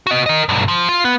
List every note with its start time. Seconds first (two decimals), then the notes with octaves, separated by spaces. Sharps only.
0.07 F#4 D#5
0.26 A#4 D#5
0.49 B1 G2
0.68 F3
0.89 F4
1.05 B3